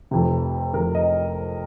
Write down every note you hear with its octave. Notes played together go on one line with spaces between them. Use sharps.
F1 F2 C3
F1 F2 C3 A#4
D#5